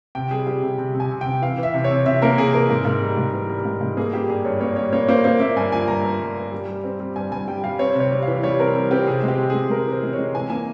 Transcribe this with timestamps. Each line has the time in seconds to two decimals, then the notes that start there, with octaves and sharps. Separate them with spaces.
0.15 C3 G5
0.31 G3 G#4
0.47 G3 G4
0.63 C3 G#4
0.78 C3
0.94 C3
1.00 G#5
1.11 C3
1.21 G5
1.26 C3
1.42 E3 F5
1.58 E3 E5
1.74 C3
1.84 C#5
1.91 C3
2.06 C3 E5
2.22 A#3 A#4
2.38 C3 G#4
2.54 E3 A#4
2.70 G#2
2.85 G#2
3.02 G3
3.17 G#2
3.33 E3
3.49 G3
3.65 G#2
3.81 G#2
3.97 A#3 G#4
4.13 G3 G4
4.29 G2 G#4
4.45 G2 C#5
4.61 A#3 C#5
4.76 G3 C#5
4.93 A#3 C#5
5.08 A#3 C5
5.24 A#3 C5
5.40 A#3 E5
5.56 G2 G#5
5.72 F3 G#5
5.88 G2 A#5
6.05 G2
6.20 G2
6.36 G2
6.52 G3
6.68 G3
6.84 C4
7.00 G3
7.16 G2 G#5
7.32 G2 G#5
7.47 G3 G5
7.64 G3 F5
7.79 C4 C#5
7.95 C3
8.00 C#5
8.11 G3
8.22 F5
8.27 E3
8.43 G3 C#5
8.59 C4 A#4
8.75 G3
8.91 C4 G4
9.07 C3 G#4
9.23 G#3
9.28 G4
9.39 C3
9.50 G#3 G#4
9.70 G#3 A#4
9.86 E3
9.92 C5
10.03 G#3
10.13 C#5
10.18 G#3
10.34 E3 G#5
10.50 A#3 G#5